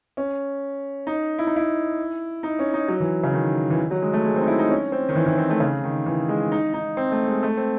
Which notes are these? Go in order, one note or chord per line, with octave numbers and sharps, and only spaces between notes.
C#4
D#4
E4
D#4
E4
D#4
C#4
D#4
F#3
E3
C#3
D#3
E3
D#3
F#3
G#3
A3
G#3
C4
D#4
E4
D#4
C#4
C4
D#3
E3
E3
C4
A3
C#3
D#3
E3
G#3
D#4
D#4
C4
A3
G#3
A3
C4